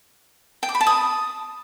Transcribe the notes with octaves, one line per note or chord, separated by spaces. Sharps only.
G5
D6
B5
A5
D#6